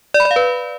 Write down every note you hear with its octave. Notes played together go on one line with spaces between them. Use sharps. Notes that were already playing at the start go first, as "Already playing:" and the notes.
D5
B5
D5
F5
B4